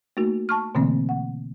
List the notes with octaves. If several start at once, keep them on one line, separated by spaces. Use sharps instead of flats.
A3 A#3 D#4 F#4 A#4
A5 C#6 F6
B2 D3 E3 A3 A#3 C4
F#5